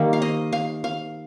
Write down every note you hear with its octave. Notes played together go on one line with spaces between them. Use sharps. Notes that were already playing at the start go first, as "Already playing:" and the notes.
Already playing: D#3 G3 A#3
F5
D#5
F5
F5